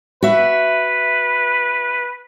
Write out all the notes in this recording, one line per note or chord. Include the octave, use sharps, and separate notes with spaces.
F#4 B4 E5